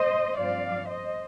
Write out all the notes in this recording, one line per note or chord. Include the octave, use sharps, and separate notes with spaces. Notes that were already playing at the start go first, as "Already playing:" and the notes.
Already playing: C5 D#5
G2 F3 C4 D5 F5
C5 D#5